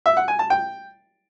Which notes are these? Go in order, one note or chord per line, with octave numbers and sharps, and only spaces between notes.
E5
F#5
G#5
A5
G5